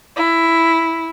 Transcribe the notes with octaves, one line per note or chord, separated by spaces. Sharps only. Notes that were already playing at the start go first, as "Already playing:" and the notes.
E4